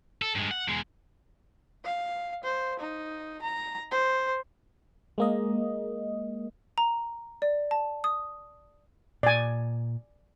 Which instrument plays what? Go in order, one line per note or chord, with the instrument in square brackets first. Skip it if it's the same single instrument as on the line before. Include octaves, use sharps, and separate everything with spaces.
[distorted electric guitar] A4
G2 G#3
F#5
E2 G#3
[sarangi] F5
C5
D#4
A#5
C5
[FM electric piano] G#3 A#3 D#5
[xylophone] A#5
D5
A5
D#6
[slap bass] A#2 [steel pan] D5 G#5